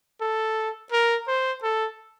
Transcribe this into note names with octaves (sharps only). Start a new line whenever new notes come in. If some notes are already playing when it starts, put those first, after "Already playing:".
A4
A#4
C5
A4